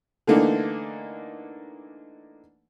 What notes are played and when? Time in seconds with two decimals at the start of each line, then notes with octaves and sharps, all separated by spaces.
0.27 D3 E3 A3 A#3 D4 D#4